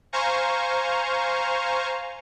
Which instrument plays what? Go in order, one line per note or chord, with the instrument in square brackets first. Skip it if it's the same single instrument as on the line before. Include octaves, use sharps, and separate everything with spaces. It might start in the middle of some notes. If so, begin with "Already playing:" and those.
[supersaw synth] C5 F5 G#5 A#5 C#6